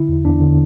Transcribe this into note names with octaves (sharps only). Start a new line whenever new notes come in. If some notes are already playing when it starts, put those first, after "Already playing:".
Already playing: D3 E4
E2
E2 D4
D3